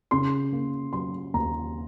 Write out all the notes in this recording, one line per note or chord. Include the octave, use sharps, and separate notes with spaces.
C#3 C6
A#3
F#3 C6
D#2 A#5